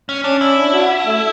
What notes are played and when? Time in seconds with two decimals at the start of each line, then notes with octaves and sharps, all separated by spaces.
0.09 C#4
0.24 C#4 D4
0.41 E4
0.57 D4
0.73 F#4
1.05 A3